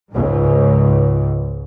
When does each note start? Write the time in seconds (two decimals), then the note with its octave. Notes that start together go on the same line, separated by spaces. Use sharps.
0.12 C#2 G#2